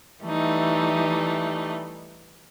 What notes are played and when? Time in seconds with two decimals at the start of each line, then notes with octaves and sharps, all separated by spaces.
0.24 E3 G3 A3 D#4